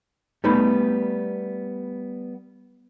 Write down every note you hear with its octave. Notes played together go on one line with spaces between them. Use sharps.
G3 A3 B3 D#4 B5